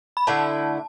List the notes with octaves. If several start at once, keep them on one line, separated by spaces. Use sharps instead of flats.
B5
D3 A3 E4 D5 A5